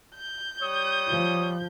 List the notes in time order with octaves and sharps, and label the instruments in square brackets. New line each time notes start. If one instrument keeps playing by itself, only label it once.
[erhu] G6
[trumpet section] G3 C#5 D#6
[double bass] F3